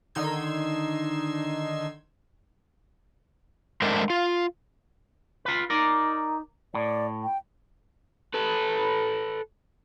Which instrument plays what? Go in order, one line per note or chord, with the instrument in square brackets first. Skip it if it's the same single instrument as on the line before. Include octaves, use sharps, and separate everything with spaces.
[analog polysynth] D3 D#3 D#4 C6 E6 G#6
[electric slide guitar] G#3 A3 C4 D4 A#4 C5
F4
[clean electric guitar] F4 B4
[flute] D#4 [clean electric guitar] A#4 D5
[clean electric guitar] A2 [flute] D5
[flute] G5
[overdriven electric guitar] A4 B4